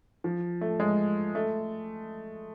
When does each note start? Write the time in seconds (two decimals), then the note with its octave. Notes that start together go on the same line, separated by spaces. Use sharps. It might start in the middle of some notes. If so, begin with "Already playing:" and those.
0.24 F3
0.61 A3
0.80 G#3
1.35 A3